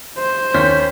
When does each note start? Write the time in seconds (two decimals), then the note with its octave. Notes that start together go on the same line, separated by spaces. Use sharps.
0.18 C5
0.54 D#2 C#4 G6 B6